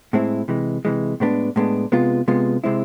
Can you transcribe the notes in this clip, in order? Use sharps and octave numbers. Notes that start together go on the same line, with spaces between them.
A2 G#3 C4 E4
C3 E3 G#3
C3 E3 G#3
A2 G#3 B3 D4
A2 G#3 B3 D4
C3 G#3 B3 F4
C3 G#3 B3 F4
C3 G#3 C4 E4